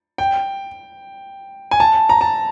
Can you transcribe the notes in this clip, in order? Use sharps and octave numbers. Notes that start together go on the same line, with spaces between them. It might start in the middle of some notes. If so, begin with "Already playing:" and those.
G5
G#5
A5
A#5
A5